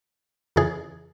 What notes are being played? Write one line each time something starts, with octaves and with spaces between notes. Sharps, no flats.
F2 C#3 E3 G#4